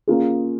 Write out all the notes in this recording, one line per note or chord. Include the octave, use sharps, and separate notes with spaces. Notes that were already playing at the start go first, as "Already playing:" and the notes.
A#3 C#4 F4 G#4